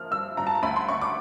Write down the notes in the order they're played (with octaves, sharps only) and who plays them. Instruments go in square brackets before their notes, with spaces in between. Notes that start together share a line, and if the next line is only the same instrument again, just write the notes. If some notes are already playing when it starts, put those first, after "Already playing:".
Already playing: [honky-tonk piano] F3 A#3 F6
G2 E6
G2 A#5
A5
A#5
D2 B5
C6
D2 C#6
D6